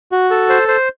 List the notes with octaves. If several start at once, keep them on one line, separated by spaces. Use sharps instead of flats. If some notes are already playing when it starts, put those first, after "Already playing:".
F#4
A4
C5
C5